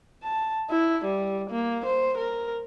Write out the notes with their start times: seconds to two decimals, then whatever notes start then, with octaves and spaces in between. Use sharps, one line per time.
0.24 A5
0.70 E4
1.05 G3
1.50 A#3
1.86 C5
2.17 A#4